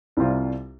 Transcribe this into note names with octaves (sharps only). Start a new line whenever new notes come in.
C2 C3 G3 C4 F4